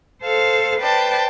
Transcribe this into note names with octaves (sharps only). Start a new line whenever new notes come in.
A4 C5 F5
B4 C5 D5 G5 A5